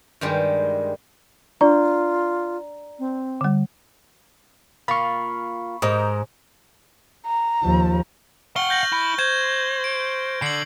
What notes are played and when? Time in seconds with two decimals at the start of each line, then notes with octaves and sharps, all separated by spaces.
0.21 G2 D#3 G3 G#3
1.61 D4 F4 D5 A#5
2.99 C4
3.41 D3 G3
4.88 A#3 F4 F5 B5 C#6
5.82 G#2 D#4 A#4 D#5
7.26 A#5
7.63 D#2 F3
8.56 F5 F#5 C#6 F6 G7
8.70 G6 A#6 F#7
8.92 E4
9.19 C5 G6 G#6
9.84 D7
10.42 D3 C7 F#7